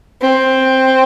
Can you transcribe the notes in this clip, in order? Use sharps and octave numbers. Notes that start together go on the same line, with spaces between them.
C4